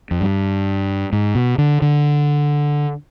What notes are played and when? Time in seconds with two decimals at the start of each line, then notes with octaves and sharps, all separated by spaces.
0.11 F2
0.21 G2
1.12 G#2
1.35 B2
1.58 D3
1.82 D3